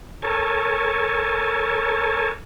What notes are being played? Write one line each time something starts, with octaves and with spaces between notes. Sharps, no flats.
A4 A#4 C#5 G#5 A5